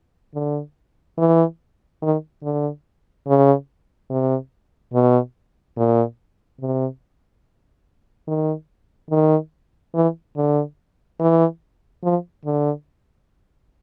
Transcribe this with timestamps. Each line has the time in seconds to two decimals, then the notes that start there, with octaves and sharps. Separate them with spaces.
0.35 D3
1.18 E3
2.02 D#3
2.43 D3
3.27 C#3
4.10 C3
4.93 B2
5.77 A#2
6.61 C3
8.28 D#3
9.11 D#3
9.95 E3
10.37 D3
11.20 E3
12.04 F3
12.45 D3